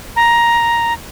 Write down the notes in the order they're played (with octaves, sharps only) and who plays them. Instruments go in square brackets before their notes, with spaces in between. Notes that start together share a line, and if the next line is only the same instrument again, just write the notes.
[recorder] A#5